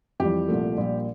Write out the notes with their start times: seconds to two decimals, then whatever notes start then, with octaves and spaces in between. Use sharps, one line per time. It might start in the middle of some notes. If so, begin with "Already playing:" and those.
0.20 F2 E3 G3 G4
0.48 C2 A#2 F3 A3
0.77 A#1 A#2 G3